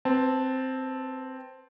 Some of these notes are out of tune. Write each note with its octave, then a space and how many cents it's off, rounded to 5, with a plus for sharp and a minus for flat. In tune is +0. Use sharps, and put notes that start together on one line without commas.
C4 +0 B4 +20 A5 +0